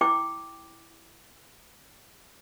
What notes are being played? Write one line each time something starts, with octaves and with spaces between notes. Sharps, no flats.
E4 G5 D6